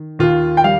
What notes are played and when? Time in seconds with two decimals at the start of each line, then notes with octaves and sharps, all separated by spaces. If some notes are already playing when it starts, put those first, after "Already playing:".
Already playing: D#3
0.19 D#2 F4
0.57 G5
0.64 G3 F5